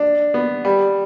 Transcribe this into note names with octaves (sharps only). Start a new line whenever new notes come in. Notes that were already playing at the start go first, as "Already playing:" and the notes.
Already playing: D4
B3
G3